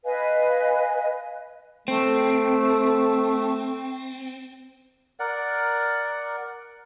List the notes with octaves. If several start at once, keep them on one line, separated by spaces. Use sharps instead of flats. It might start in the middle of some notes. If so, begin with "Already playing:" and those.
B4 D#5 F5 G#5
A3 C4
A#4 D5 F#5